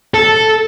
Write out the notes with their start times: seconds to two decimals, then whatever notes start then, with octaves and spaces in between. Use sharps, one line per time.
0.14 A4